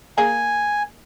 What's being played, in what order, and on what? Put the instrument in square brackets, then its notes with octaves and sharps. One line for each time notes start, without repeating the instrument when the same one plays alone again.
[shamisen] A#3 G#4 [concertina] G#5